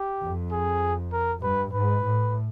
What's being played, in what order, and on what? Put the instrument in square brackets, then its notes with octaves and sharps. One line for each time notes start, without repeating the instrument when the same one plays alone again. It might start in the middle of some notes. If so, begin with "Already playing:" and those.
Already playing: [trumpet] G4
[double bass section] F2
[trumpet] G#4
A#4
[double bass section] G2 [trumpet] B4
[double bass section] G#2 [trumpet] B4
[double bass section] A2